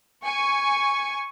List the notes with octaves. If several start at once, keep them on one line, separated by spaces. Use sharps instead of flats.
G#5 C#6